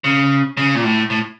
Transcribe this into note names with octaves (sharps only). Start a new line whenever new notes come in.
C#3
C#3
A#2
A2
A2